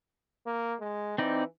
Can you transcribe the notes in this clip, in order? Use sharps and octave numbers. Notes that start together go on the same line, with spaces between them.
A#3
G#3
E3 C4 D#4 D5